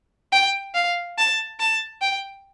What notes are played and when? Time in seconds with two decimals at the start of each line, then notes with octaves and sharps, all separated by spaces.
0.32 G5
0.74 F5
1.18 A5
1.60 A5
2.01 G5